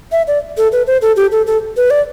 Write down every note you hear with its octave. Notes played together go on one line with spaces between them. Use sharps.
E5
D5
A4
B4
C5
A4
G4
A4
A4
B4
D5